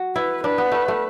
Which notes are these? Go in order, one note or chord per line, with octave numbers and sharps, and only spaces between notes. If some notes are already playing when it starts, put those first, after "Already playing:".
Already playing: F#4
E4 B4
D4 B4
B3
A3
A3